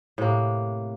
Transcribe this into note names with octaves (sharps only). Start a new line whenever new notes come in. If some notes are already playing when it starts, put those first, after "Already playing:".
A2 C3 A#3